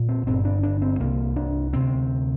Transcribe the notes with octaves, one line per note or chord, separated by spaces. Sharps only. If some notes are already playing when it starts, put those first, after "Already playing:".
Already playing: A#1 A#2
C4
G1 G2 D3 C4
D4
D4
C4
C2 C3 A#3
D4
D2 C3 C4